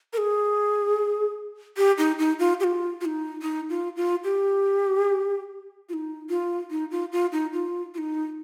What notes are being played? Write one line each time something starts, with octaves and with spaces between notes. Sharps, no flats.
A#4
G#4
G4
D#4
D#4
F4
G4
F4
F4
D#4
D#4
F4
F4
G4
F4
D#4
F4
D#4
F4
F4
D#4
F4
F4
D#4